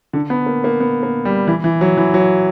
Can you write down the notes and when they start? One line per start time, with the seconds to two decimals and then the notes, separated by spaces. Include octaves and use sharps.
0.13 D3
0.30 B3
0.46 A#3
0.64 A#3
0.80 B3
1.03 A#3
1.25 G3
1.47 E3
1.64 E3
1.81 F#3
1.97 E3
2.14 F#3